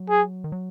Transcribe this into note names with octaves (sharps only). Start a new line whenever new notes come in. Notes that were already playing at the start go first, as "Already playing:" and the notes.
Already playing: F#3
G#4
D#3
F#3